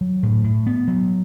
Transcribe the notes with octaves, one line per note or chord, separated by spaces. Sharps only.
F#3
A2
A2
B3
F#3